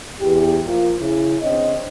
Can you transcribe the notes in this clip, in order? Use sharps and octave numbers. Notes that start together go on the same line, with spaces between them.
E2 G4
F3 A#3
C#3 E4
C#3 C4 D4 C#5 D#5